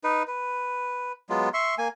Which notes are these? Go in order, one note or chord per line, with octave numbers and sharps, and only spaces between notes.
D#4 B4
B4
F#3 G#3 B3 F4
E5 C6 C#6
A#3 G#5